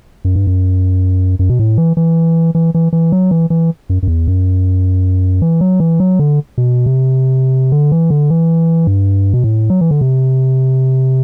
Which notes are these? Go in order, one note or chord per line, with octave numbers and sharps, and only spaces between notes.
F#2
G2
F#2
F#2
B2
A2
E3
E3
E3
E3
E3
F#3
E3
E3
F#2
F#2
E2
F#2
E3
F#3
E3
F#3
D3
B2
C3
D3
E3
D3
E3
G2
B2
A2
F#3
E3
D3
C3